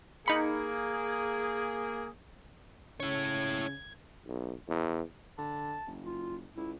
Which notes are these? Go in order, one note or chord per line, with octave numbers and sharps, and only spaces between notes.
A#3 D#4 G#4 B5 C#7
C#3 C#4 E4 C#5 G#6
B1
E2
D3 A5
F#1
F4
C#2 E4